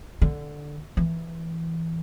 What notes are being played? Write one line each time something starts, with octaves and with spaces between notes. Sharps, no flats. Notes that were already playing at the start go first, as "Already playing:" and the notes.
D3
E3